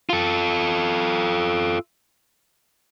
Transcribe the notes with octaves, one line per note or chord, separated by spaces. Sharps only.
F4 A4